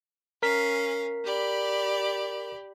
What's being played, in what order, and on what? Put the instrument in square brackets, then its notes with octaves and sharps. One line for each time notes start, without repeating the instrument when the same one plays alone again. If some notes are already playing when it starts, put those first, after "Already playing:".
[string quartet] C#4 F5 [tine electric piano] A#4 B6
[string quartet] G4 D5 B5